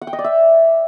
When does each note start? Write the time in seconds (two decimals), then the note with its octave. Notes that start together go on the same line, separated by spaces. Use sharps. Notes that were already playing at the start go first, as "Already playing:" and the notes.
0.02 F#5
0.07 G5
0.13 D#5
0.19 D5
0.24 E5